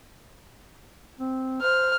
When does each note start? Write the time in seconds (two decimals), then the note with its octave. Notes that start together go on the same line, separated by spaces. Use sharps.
1.19 C4
1.62 C5 F6